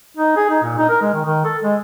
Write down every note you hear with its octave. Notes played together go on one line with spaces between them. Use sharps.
D#4
G#4
D#4
A#2
D#4
A#4
G#3
D#3
D#3
A4
G#3